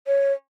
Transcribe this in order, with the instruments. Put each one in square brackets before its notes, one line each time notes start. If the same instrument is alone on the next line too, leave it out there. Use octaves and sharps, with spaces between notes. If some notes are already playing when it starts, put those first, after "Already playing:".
[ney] C#5